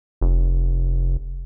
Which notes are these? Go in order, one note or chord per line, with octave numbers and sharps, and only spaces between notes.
F1